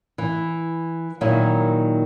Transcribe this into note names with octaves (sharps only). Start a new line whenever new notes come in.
E3
A#2 D#3 F#3 E4